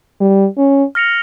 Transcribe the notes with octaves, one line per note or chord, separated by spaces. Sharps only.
G3
C#4
F6 A#6 C#7 F7